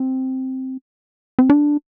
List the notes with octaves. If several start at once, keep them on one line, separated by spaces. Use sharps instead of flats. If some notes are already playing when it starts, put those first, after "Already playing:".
Already playing: C4
C4
D4